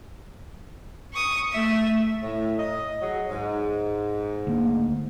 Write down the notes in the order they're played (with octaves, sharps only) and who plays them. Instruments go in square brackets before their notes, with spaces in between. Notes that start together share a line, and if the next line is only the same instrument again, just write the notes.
[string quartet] C#6 D#6
A3 E5
[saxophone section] A2
D#5
F#3 G#4 D#5
G#2
[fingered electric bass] D2 A#3